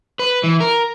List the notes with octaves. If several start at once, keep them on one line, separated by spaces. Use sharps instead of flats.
B4
E3
A#4